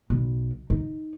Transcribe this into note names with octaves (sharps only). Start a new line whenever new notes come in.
B1
D#4